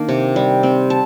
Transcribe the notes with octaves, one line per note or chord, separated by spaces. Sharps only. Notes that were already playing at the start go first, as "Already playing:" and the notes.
Already playing: D#3 A#3 D4
C3
G3
C4
A5